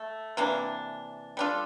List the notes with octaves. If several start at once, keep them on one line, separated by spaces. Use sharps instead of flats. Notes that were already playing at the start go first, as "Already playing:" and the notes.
Already playing: A3
C3 E3 A#3 D4
G3 D4 F4 A4